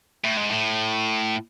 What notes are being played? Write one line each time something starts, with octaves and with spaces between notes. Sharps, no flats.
A2
G#2
A2